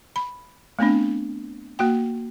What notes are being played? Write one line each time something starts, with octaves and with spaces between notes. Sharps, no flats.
B5
A3 B3 C4 D4
A#3 F#4 G5